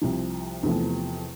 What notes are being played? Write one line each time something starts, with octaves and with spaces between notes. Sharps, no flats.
C2 C3 F3
E2 C3 F3 A3